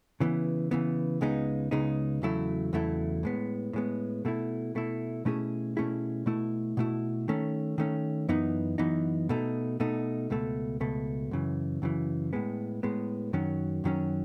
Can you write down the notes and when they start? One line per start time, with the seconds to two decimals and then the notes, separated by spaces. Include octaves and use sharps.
0.20 C#3 E3 B3
0.71 C#3 E3 B3
1.21 C#2 C#3 G#3 B3 D#4
1.71 C#2 C#3 G#3 B3 D#4
2.22 E2 C#3 F#3 A3 E4
2.73 E2 C#3 F#3 A3 E4
3.23 A2 G#3 B3
3.73 A2 G#3 B3
4.25 B2 A3 E4
4.75 B2 A3 E4
5.25 B2 A3 C#4 E4 G#4
5.77 B2 A3 C#4 E4 G#4
6.26 B2 A3 E4
6.77 B2 A3 E4
7.28 D#3 A3 C#4
7.78 D#3 A3 C#4
8.29 F#2 E3 B3 D#4
8.78 F#2 E3 B3 D#4
9.29 B2 A3 D#4
9.80 B2 A3 D#4
10.30 C#2 B2 A3
10.80 C#2 B2 A3
11.31 F#2 C#3 E3
11.82 F#2 C#3 E3
12.33 A2 G#3 B3
12.83 A2 G#3 B3
13.33 F#2 D#3 F#3 C#4
13.84 F#2 D#3 F#3 C#4